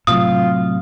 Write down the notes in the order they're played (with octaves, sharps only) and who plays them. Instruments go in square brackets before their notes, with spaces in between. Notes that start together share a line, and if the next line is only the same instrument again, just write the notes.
[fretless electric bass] A2 C3 F#3 [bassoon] F4 [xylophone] D#6